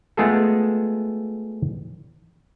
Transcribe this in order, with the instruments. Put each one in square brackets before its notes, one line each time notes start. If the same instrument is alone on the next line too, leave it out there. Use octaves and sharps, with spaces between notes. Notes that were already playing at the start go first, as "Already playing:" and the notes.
[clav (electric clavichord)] G#3 A3 B3 F4 G#4 A4